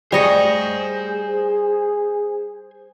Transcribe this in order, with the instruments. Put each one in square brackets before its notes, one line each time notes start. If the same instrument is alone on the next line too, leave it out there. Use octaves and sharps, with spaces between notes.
[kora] G3 [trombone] G#4 [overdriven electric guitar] C5 G#5 [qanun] C#5 D#5 C#6